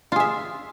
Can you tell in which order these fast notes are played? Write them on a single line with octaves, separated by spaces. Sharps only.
F4 G#4 E5